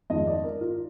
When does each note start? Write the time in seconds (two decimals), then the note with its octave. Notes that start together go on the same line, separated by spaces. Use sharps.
0.10 F2 D#3 G#3 D#5
0.27 D5
0.44 A#4
0.61 F4